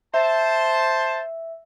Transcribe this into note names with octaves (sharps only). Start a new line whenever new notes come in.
C5 E5 A5